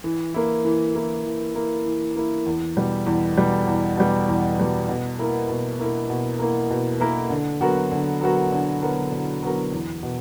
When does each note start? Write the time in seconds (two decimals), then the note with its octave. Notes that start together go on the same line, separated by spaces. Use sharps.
0.04 E3
0.34 A#3 E4
0.65 E3
0.95 A#3 E4
1.25 E3
1.55 A#3 E4
1.85 E3
2.16 A#3 E4
2.46 E2
2.77 B2 G3
3.06 E2
3.37 B2 G3
3.67 E2
3.97 B2 G3
4.28 E2
4.58 B2 G3
4.89 B2
5.19 A#3 E4 A#4
5.49 B2
5.79 A#3 E4 A#4
6.10 B2
6.39 A#3 E4 A#4
6.70 B2
7.00 A#3 E4 A#4
7.30 D3
7.61 F#3 B3 F#4 A#4
7.91 D3
8.21 F#3 B3 F#4 A#4
8.52 D3
8.82 F#3 B3 F#4 A#4
9.12 D3
9.42 F#3 B3 F#4 A#4
9.72 E2
10.03 B2